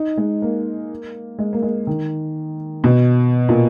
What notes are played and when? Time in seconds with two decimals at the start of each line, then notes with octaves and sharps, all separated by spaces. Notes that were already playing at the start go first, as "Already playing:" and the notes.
Already playing: D#4
0.17 G#3
0.42 A#3
1.39 G#3
1.53 A#3
1.62 G#3
1.87 D#3
2.84 B2
3.49 A#2